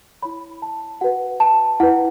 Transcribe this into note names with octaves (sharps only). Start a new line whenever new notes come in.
E4 C#5 B5
A5
F#4 B4 F#5
A5
E4 B4 F#5